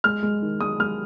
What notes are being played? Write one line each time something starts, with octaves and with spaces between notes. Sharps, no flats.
G#3 F6
G#3
D#3
G#3 D#6
G#3 F6